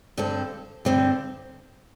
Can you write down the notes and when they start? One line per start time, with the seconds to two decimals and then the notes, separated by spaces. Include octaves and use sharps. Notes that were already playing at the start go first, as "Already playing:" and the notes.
0.17 G2 D3 C4 A4
0.85 G2 D3 C4 A4